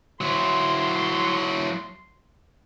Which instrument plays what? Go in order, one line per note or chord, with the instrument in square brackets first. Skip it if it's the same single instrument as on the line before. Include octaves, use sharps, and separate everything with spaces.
[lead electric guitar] F#3 E4 [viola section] C6